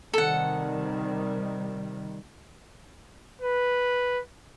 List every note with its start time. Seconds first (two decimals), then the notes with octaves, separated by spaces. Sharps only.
0.13 C3 D#3 G3 A4 F#5
3.41 B4